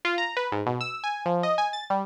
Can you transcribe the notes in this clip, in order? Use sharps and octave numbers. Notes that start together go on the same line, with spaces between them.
F4
A#5
B4
G#2
B2
E6
G#5
F3
D#5
G#5
A6
G3